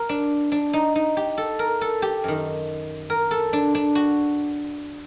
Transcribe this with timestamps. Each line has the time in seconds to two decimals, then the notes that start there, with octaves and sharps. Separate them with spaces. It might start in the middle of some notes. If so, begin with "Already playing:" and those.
Already playing: A#4
0.09 D4
0.52 D4
0.73 D#4
0.95 D#4
1.17 G4
1.38 A4
1.59 A#4
1.81 A4
2.02 G4
2.24 F#2 D#3
3.10 A#4
3.31 A4
3.53 D4
3.75 D4
3.95 F#4